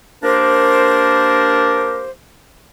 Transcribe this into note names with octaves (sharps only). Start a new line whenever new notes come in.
A#3 D4 G4 A#4 C5